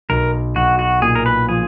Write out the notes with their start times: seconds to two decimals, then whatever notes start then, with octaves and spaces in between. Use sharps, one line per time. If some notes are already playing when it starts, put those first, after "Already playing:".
0.09 B1 A#4
0.56 B1 F#4
0.79 F#4
1.02 A#2 G#4
1.15 A#4
1.26 B4
1.48 F3 G#4